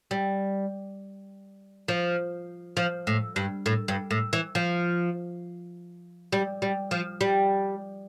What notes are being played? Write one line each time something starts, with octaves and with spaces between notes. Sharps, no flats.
G3
F3
F3
A2
G2
A2
G2
A2
E3
F3
G3
G3
F3
G3